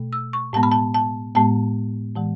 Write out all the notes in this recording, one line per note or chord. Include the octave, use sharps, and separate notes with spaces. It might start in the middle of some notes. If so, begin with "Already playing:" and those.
Already playing: B2 A3
E6
C#6
A2 G#3 B3 A5
B5
A5
A5
A2 G#3 B3 A5
A2 E3 G#3